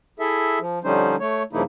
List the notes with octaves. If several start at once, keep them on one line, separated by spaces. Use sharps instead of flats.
E4 G#4 A4 E5
F3
D3 F3 G3 C#4 D#4 C5
A3 C#5
G2 C#3 F3 A#3 D#4 E4